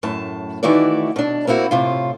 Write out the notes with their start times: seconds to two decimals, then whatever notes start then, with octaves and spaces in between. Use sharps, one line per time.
0.03 F#2 A2 A5
0.63 D#3 E3 A3 E4 F#4 D5
1.16 B2 D4
1.47 A#3 C4 E4 F#4
1.71 A2 C3 F4